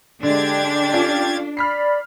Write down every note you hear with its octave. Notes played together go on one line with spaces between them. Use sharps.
D3 G#3 D4 G4 G#6 A6
C#4 F4 A4
D5 B5 F6 B6 C7